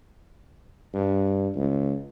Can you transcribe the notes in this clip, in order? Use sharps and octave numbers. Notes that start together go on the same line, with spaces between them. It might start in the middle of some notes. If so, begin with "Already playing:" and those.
G2
C#2